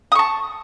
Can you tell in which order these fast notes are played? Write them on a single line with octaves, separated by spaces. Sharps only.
D#6 C#6 A5